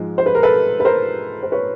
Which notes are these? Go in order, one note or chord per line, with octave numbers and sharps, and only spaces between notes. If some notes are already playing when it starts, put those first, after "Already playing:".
Already playing: G#2 F3 G#3
C5
B4
A#4
A4 B4
B4
A#4 C5
C5
B4 C#5